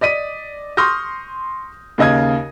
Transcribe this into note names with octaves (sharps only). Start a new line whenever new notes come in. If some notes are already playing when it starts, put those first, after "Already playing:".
D5 D#5 B6 D#7
C6 C#6 D#6 F6 G6 A#6
D#2 C#3 D#5 D#6 G#6